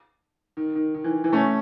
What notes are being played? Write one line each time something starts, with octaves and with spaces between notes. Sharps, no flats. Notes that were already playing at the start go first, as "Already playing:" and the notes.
D#3
D#3
D#3
E3
E3
A3 C#4